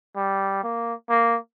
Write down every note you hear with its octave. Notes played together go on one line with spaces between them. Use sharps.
G3
A#3
A#3